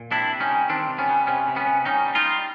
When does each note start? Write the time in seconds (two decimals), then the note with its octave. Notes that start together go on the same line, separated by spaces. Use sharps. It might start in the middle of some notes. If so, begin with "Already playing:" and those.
Already playing: A#2
0.11 C3 D4 E4
0.31 C3
0.40 C#4 D#4
0.50 G3
0.69 D#3 C4 D4
0.89 C3
0.98 B3 C#4
1.08 G3
1.27 C3 B3 C#4
1.47 C3
1.56 B3 C#4
1.66 C3
1.85 G3 C#4 D#4
2.05 G3
2.15 D#4 F4
2.25 G3